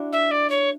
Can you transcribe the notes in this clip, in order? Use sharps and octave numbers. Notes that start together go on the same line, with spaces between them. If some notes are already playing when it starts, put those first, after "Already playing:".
Already playing: D4 E4 F#4
E5
D5
C#5